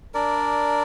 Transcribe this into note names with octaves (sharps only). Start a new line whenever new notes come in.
D4 A#4 D5